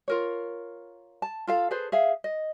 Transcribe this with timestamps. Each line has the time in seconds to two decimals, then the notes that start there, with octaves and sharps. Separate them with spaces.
0.08 F4 A#4 C#5
1.22 A5
1.47 F4 A4 F5
1.71 G#4 A4 B4 C5
1.92 G#4 E5 F5
2.24 D#5